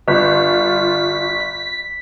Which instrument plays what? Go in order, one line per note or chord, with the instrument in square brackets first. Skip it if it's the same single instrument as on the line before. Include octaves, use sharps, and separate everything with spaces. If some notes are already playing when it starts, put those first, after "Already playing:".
[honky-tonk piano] G1 [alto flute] F4 [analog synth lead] B6